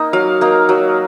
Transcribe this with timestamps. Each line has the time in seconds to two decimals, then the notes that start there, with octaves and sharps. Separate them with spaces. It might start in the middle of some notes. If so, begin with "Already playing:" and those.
Already playing: A#3 D#4
0.13 F#3 F5
0.41 A#3 D#4
0.69 F#3